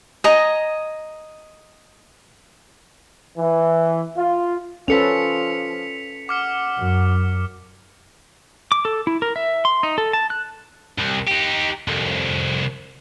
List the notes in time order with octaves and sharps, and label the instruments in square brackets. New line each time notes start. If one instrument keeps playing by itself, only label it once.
[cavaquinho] D#5 G#5 A#5
[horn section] E3
F4
[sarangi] F3 [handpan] C#4 A4 B4 [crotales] B6 C#7 F7
[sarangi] F#5 [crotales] D6 F6 C#7
[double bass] F#2
[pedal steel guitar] D6
A4
E4
A#4
E5
C6
D#4
A4
A5
F#6
[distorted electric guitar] C2
D#4 G4
C2 F2